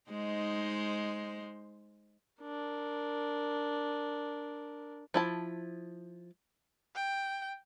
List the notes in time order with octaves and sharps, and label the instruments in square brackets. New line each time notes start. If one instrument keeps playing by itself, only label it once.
[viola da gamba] G#3 D#4 C5
[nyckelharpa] D4 A#4
[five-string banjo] F3 E4 A5
[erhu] G5